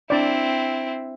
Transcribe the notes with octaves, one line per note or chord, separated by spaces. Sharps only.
C4 D4 E4 D5